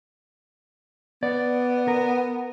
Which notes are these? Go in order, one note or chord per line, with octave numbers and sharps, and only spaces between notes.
B3 D5
A#4